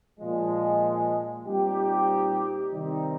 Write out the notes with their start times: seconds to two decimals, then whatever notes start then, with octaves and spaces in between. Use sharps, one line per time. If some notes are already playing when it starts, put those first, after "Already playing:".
0.19 A#2 F3 G#3
1.46 A#2 G3 C4 D#4 G4
2.73 C3 D#3 G3 C4 D#4